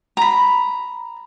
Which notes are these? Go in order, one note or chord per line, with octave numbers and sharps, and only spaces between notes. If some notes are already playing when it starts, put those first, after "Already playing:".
A#5 B5